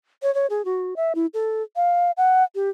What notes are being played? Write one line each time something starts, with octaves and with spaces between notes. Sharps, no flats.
C#5
C#5
G#4
F#4
E5
E4
A4
F5
F#5
G4